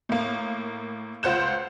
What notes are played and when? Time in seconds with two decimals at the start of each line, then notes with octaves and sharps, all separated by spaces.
0.09 A2 A#3
1.23 C#2 F4 C5 F#5 G6 E7